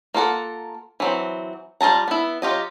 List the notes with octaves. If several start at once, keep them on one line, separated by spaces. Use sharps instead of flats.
A#3 F4 A4 F#5
E3 F#3 C4
G3 F4 G#4 A5 A#5
B3 E4
F#3 F4 G4 D#5